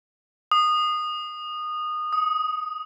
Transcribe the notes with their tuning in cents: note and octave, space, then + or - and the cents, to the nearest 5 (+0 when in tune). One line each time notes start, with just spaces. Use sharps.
D#6 -20
D#6 +10